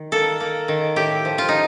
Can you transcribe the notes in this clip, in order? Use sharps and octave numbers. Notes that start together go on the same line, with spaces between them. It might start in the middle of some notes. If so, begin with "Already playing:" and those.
Already playing: D#3
A#3 A4
A#3
D#3
A2 G4
F3
F4
D#4